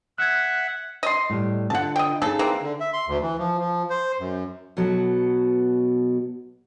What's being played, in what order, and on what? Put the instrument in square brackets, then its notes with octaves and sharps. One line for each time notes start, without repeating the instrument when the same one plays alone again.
[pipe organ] E5 F#5 [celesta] F#6 G#6
[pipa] D#5 C6
[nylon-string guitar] A2 G3
[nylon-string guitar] D3 F4 [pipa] F#5 A5
[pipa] D#5 G5
[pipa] C#3 A4 [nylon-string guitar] D#4 G#4
[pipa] E3 A#3 C4
[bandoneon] D3
E5
C6
D2
E3
F3
F3
C5
F#2
[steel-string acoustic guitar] B2 F#3 B3 F#4 A4